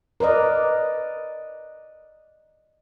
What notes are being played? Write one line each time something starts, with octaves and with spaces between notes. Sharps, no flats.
A#4 B4 D5 D#5